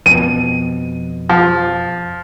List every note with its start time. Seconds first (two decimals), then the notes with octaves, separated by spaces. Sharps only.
0.06 F2 B2 D#7
1.29 F3